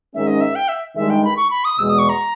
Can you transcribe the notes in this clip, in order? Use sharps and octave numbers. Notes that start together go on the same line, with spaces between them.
G#2 D#3 G#3 C#4 E5
D#5
E5
G5
E5
G2 D#3 G#3 E5
G5
B5
C#6
B5
D#6
E2 B2 G#3 E6
D#6
C#6
A#5